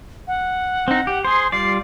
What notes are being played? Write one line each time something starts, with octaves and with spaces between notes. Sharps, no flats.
F#5
C4 D#4
G4
G#4 C5 C6
G3 F4 D5 C7